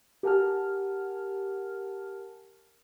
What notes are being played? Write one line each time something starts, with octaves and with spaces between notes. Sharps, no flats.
G4 A#4 F#5 G#5 A5 F6